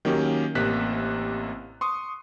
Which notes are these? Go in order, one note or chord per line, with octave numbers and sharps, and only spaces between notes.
D#3 F#3 A#3 C#4 G4
A1 C3 A#3 F#6 B6
C6 C#6 D#6